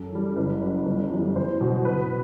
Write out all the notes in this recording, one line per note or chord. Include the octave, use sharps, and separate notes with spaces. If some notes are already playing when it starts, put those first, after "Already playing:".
Already playing: F#2 A4
E3 G3
F#1 B4
F#2 F#3
G1
F#2 E3 G3
E2 C5
B2 F#3
F#1 B4